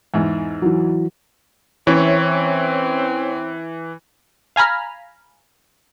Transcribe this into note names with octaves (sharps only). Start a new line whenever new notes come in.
E2 G#2
E3 F#3
E3 C4 C#4 E4 C#5
F5 G#5 A#5 B5 F6